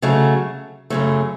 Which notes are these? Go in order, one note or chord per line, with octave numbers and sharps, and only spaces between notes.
C#3 F#3 A3
F#2 C#3 F#3 A3